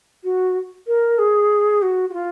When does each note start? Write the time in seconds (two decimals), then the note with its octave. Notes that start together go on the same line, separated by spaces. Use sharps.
0.23 F#4
0.87 A#4
1.18 G#4
1.82 F#4
2.09 F#4
2.13 F4